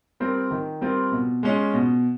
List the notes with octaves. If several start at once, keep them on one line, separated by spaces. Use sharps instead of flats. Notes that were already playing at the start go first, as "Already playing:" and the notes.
G3 C4 F4 A#4
D#3
G3 C4 F4 A#4
B2
G#3 C#4 F4
B2